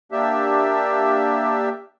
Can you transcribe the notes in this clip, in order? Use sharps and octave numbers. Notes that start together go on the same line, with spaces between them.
A#3 D4 G4 E5